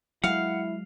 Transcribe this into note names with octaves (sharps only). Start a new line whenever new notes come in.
F#3 G#3 E4 F5 F#5